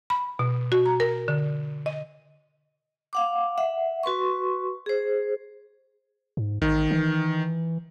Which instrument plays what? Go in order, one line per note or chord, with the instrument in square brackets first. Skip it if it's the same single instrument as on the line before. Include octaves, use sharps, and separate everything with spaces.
[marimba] B5
B2
F#4
A#5
A#4
D3
D#5
[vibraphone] F5 F#5 D6
E5 F#5
F#4 B4 C6 C#6
G#4 C5
[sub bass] G#2
[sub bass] A1 [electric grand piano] D#3
[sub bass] E3